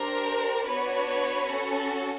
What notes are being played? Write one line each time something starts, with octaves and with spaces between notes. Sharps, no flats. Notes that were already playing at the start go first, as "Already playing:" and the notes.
Already playing: D4 G4 A#4 C5
B3 D4 F#4 B4 C#5
C#4 F#4 A4